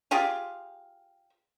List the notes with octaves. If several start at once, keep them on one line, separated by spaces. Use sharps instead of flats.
F4 G4 G#4 F5